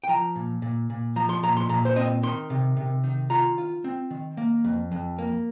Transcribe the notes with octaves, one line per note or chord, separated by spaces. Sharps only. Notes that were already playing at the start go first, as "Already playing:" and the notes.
G5
F3 A#5
A#2
A#2
A#2
F3 A#5
C6
A#2 A#5
C6
A#2 A#5
C5
C4 D#5
D#3 C6
C3
C3
D#3
F4 A#5
F4
C4
D#3
A#3
F2
F2
A#3